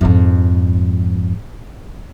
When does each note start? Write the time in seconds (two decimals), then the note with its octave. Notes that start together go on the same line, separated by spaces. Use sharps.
0.01 F2 G#2